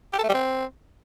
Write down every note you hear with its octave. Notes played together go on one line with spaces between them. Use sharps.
G4
A4
A3
G3
C4